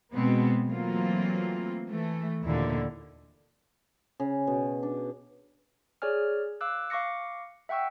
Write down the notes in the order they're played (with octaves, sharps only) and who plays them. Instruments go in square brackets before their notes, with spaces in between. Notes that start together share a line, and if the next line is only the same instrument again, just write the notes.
[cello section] B2 G#3 B3 C4
E3 F#3 A3 A#3 C4 F4
E3 A3
D#2 A#2 D3 E4
[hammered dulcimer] C#3
B2
D4
[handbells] G#4 C#5 D5 G#5 F6
F5 D6 E6 F#6
F5 C#6 D6 A#6 C#7
E5 F#5 G5 C#6 E6